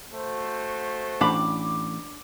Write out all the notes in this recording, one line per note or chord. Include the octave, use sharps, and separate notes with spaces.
A3 F#4 C5
A1 D4 B5 D6